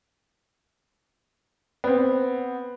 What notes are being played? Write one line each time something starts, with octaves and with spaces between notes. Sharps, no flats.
B3 C4